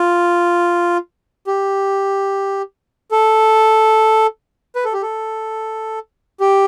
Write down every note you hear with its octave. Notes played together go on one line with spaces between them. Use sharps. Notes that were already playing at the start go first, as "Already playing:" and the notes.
Already playing: F4
G4
A4
B4
A4
G4
A4
G4